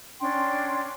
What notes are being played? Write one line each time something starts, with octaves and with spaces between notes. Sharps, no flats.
C#4 D4 G5 C6